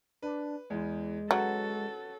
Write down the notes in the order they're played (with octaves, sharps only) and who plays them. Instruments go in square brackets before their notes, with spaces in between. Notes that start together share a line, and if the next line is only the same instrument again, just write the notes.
[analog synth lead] D4 [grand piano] B4
[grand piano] E2 E3 [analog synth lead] G#3
[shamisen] F#3 [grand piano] C#4 F#4 B4 [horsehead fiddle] A4